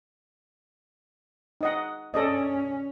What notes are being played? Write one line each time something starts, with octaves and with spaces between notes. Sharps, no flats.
D#4 D#5 F#5
C#4 A4 D5 D#5